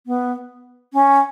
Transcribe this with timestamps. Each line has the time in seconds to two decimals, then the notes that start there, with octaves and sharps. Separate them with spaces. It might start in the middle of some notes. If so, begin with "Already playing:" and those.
0.07 B3
0.93 C#4